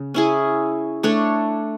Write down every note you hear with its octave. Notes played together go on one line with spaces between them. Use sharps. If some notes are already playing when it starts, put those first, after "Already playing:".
Already playing: C#3
C#4 E4 G#4
A3 D4 A4 C#5